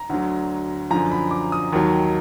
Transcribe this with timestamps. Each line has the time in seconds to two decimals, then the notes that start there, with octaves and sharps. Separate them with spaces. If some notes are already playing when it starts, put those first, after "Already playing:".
Already playing: A#5
0.09 D2 D3 F#3
0.91 F#2 D3 F3 A#5
1.12 B5
1.31 D6
1.52 D#6
1.73 D#2 D#3 F#3